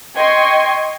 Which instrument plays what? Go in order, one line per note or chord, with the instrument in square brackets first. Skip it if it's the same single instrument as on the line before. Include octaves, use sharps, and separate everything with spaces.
[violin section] D#5 G5 C6 C#6 G#6